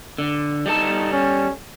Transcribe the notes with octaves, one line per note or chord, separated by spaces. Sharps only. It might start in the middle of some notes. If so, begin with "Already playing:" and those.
D3
G3 D#4 A4 A5
C#4